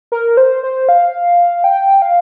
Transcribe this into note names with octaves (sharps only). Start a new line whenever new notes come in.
A#4
C5
C5
F5
G5
F5